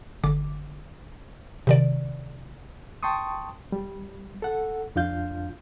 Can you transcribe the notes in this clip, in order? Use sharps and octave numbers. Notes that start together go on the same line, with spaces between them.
G1 D3 D6
C3 D#3 D5
G5 A5 C6 C#6 D#6
G3
A4 F#5
F2 D4 F4 F5 G6